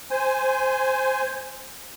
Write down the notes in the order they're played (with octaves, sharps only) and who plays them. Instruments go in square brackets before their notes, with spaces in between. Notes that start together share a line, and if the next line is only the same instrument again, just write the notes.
[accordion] C5 G#5